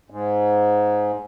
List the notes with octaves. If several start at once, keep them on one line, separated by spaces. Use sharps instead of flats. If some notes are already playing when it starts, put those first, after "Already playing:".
G#2